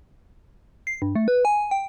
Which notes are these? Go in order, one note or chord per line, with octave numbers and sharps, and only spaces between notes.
C7
G2
A3
B4
G#5
G5